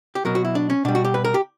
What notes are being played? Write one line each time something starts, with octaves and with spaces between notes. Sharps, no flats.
G4
B2 F#3 A#4
F#4
E4
D4
C#4
B2 G3 D4
F#4
G4
B4
A#4
G4